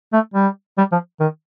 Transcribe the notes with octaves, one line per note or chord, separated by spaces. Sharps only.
A3
G3
G3
F3
D#3